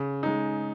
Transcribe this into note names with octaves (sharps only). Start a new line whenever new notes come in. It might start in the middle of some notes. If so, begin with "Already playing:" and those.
Already playing: C#3
G#3 D#4